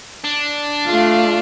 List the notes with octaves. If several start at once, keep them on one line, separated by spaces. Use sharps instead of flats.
D4
A3 F4 F5